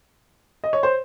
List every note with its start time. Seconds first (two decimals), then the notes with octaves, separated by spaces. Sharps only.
0.64 D#5
0.73 C#5
0.83 C5